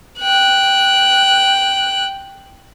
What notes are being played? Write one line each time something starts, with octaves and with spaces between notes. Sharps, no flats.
G5 F#6